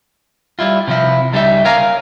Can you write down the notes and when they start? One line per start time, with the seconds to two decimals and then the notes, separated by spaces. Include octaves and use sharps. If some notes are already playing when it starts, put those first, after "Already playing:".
0.59 G3 E4 F4
0.87 C3 F3 E4
1.32 C#2 G3 D#4 E5
1.65 A#4 C#5 F5 G#5 A#5